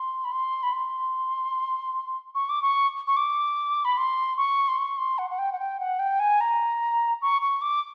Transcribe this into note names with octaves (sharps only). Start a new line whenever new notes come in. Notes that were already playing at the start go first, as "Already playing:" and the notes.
Already playing: C6
B5
C6
B5
C6
C#6
D6
C#6
C#6
D6
B5
C6
C#6
C6
C#6
C6
F#5
F#5
G5
F#5
G5
F#5
G5
G#5
A#5
C#6
C#6
D6